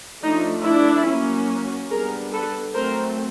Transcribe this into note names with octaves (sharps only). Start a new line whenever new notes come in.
F3 A3 D4 D#4
D4 E4
F#3 A#3 C#4
G3 B3 D4 G#4 A#4
A4 B4
F#3 A3 C4 A#4 C5